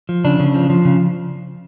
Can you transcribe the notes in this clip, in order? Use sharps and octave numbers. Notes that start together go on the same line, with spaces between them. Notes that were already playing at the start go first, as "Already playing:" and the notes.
F3
C#3 D4
C#3
F3
F3
C#3